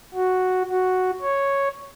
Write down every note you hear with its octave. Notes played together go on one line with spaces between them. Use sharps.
F#4
F#4
C#5